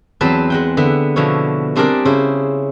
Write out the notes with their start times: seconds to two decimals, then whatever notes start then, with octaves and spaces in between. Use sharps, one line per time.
0.21 E2 F#3 C4 B4 C5 A5
0.50 G#3 F#5 G5
0.77 D3 B3 E5
1.16 B2 D3 F3 E4 C#5
1.76 G3 C4 D4 G#4 A#4 D5
2.05 C#3 E4 C5